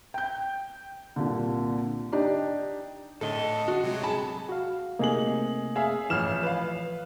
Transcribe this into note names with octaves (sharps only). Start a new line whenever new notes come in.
G5 G6
C2 A#2 D3
D4 D#4 G4
A2 D3 A4 D#5
F#4
C3 F#3 G#3
G#4 A5 B5
F#4 F5
C3 A3 A#3 D#4 G#4 F#7
G#4 E5 F5
A1 E3 F3 F6 E7
B4 F5